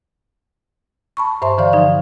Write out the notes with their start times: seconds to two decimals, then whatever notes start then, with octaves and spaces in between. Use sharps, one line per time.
1.17 A5 B5 C#6
1.42 G2 C5 E5 A5 C6
1.58 D3 E3 C5 D5 F5
1.73 F3 D#4 F5